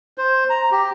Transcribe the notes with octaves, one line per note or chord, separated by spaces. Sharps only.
C5
A#5
G4